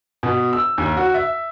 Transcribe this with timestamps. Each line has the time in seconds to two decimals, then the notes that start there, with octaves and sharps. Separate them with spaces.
0.23 B2
0.53 E6
0.78 D#2
0.97 F#4
1.14 E5